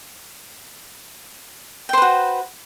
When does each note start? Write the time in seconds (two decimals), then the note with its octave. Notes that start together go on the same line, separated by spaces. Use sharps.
1.89 G5
1.93 C5
1.98 B4
2.02 F#4